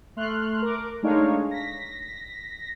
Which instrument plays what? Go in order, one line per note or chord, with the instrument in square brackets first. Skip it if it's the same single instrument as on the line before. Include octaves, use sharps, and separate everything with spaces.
[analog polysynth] A3 C6 F6 F#6
A#4 D6
G#3 A3 D4 D#4 C#5 F5
A#6 B6